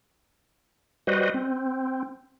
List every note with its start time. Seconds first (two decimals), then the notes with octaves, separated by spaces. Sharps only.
1.07 G3 F#4 B4 C5 D#5
1.34 C4